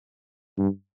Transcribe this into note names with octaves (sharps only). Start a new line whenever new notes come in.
G2